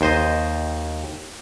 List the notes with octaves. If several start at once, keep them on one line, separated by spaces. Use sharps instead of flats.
D#2 C5 D#5